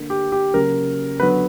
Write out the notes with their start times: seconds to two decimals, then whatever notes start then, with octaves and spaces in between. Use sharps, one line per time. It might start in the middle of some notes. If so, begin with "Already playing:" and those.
Already playing: D3 A#3
0.10 G4
0.32 G4
0.54 C#3 F#3 A#3 A#4
1.20 D3 F#3 B3 B4